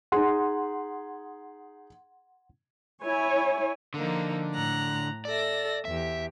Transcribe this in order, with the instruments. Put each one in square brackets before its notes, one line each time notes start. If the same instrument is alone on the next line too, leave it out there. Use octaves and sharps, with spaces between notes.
[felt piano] D#4 G#4 [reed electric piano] F#5 C6
[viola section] E4 C#5 G#5
[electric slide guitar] D3 [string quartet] F3 A#3 D#4
[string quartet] A2 A#5 F#6
[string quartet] A4 E5 A#6 [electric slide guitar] D5
[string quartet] E2 G4 [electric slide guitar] E5